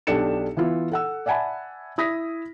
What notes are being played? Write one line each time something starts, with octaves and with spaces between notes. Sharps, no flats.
B1 D4 G4 A4 C#7 E7
E3 B3 E4 F4
A4 F#5 E6
D5 E5 F#5 G#5 A5 B5
E4 D#6 A#6 B6